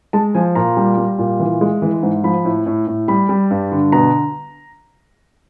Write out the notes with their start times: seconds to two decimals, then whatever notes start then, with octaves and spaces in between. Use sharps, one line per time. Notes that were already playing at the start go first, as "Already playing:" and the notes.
0.13 G#3 A5
0.34 F3 G#5
0.55 A#2 A#5
0.77 G3
0.97 G3
1.19 A#2
1.40 E3
1.61 G#3
1.82 E3
2.03 G#2
2.24 F3 B5
2.45 A2
2.66 A2
2.87 A2
3.08 G3 B5
3.29 G3
3.51 G2
3.72 D3
3.92 B2 A#5